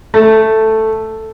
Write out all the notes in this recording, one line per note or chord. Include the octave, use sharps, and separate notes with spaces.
A3